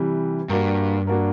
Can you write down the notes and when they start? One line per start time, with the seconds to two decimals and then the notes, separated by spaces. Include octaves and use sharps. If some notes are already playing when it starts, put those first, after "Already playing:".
Already playing: C3 E3 G3
0.49 G2 A#3 D4 F#4 A#4
1.07 A#3 D4 F#4 A#4